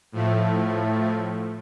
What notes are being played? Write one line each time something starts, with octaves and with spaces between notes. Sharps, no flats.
A2 F3 A3